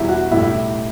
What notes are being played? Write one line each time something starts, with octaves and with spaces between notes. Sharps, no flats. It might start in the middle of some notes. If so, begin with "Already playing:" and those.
Already playing: E2 B2 G3 E4
F#4
B1 A2 G3 E4
E4